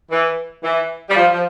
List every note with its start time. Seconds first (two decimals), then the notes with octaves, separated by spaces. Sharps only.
0.10 E3
0.63 E3
1.10 G3
1.16 F3
1.31 F3